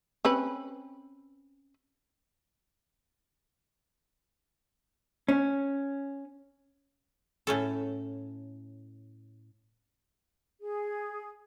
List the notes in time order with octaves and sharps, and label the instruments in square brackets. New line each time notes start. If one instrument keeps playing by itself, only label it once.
[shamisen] C4 C#4 B4
[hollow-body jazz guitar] C#4
[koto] A2 C#4 A4
[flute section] G#4